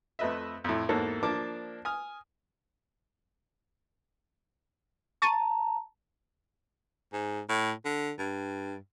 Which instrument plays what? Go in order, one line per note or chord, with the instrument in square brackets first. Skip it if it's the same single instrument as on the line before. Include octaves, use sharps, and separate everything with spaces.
[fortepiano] F2 A3 B4 D#5 E5
F2 A2
E2 G#2 A#3 F#4 A4 C#5
F3 A#3 D4 A5 D6
G#5 D#6 F6
[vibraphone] A5 A#5 [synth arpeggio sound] C#6 A6 D#7
[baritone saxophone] G#2
A2
D3
G2